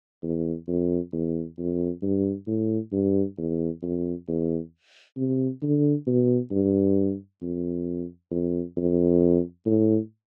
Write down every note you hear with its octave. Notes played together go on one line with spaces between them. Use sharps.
E2
F2
E2
F2
G2
A2
G2
E2
F2
E2
C3
D3
B2
G2
F2
F2
F2
A2